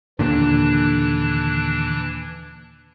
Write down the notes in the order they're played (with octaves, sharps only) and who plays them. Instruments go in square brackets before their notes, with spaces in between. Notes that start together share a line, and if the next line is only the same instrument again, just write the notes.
[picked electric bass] D#2 A#2 D3 [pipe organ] E3 D4 F#6